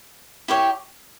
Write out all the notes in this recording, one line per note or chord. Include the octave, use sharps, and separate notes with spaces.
E4 G4 C#5 G5